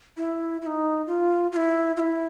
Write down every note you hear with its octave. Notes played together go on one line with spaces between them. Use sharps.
E4
E4
D#4
F4
F4
E4
F4
E4